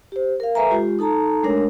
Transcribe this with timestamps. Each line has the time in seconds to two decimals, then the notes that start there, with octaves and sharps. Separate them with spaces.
0.12 G4 C5
0.40 A#4 F5
0.55 A4 B4 E5 G#5 A#5
0.71 G#3 F4 G4
0.99 D#4 A4 A5 A#5
1.43 G#3 A3 D4 A#4 C#5